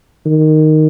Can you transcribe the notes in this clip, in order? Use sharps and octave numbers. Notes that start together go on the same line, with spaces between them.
D#3